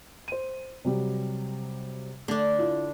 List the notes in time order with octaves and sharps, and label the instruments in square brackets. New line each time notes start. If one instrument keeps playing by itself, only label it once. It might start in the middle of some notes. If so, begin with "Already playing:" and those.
[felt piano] C5 D#7
C3 F#3 G3
[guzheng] D3 D4 [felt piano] A3
[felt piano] E4 F4